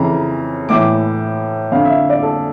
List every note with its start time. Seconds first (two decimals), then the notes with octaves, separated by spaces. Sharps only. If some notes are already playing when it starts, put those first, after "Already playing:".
Already playing: F2 C#3 E3 A#5
0.69 A2 E3 D6
1.72 F2 D3 F5
1.85 E5
2.10 D5
2.23 A4